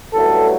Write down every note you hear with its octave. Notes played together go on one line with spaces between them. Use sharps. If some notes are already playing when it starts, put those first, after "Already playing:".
A1 G2 F#3 A3 A4